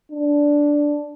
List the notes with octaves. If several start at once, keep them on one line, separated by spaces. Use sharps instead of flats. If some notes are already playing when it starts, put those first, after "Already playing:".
D4